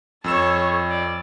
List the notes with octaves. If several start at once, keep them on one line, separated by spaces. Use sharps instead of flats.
F2 A4 C#5 E6 E7
D5